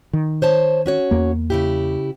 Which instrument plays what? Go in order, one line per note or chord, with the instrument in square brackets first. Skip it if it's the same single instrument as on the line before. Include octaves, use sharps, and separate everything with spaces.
[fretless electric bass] D#3
[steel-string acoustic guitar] C5 C#5 A5
C#4 F#4 C#5
[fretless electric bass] E2 A#3
[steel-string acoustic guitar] C#3 E4 G4